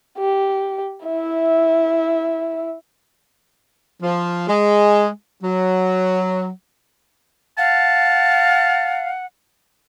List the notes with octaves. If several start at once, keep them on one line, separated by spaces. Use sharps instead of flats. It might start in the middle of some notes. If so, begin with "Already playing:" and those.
G4
E4 E5
F3
G#3
F#3
F5 F#5 A5